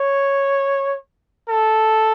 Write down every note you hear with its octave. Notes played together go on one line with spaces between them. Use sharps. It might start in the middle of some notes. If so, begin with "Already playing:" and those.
Already playing: C#5
A4